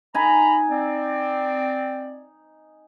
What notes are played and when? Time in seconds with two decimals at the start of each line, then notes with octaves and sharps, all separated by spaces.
0.15 D#4 G#5 A#5 B5
0.69 C4 D5